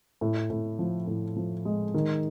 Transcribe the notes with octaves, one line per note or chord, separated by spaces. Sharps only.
A2
A2
F3
A2
F3
G#3
D#3